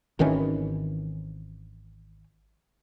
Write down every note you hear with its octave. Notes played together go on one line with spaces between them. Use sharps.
G#1 D#3 E3 C#4